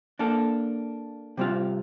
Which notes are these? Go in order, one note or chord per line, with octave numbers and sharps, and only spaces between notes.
A#3 D4 A4
C3 G3 C4 F4